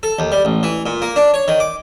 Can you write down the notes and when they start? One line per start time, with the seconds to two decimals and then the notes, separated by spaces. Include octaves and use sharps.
0.03 A4
0.19 D#2
0.32 G3
0.45 A1
0.63 E3
0.86 A#2
1.02 A#3
1.16 D4
1.34 C#5
1.48 D#3
1.60 D6